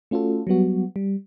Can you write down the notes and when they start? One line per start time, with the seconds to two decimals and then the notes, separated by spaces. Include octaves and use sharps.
0.11 A3 C#4 F4 F#4 A4
0.47 F#3 G3 B3 F#4
0.96 G3